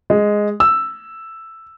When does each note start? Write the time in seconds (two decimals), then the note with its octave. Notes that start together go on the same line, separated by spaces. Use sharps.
0.10 G#3
0.60 E6